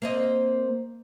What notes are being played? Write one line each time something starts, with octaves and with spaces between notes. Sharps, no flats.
A#3 C4 D#5